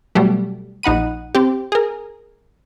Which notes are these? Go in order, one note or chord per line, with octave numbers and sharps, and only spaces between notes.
B2 F#3 G3 A3
A#1 D#4 F#5 B5 D#7
C4 G4
G#4 A#4